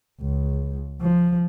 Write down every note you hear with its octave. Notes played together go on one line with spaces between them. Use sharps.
C#2
F3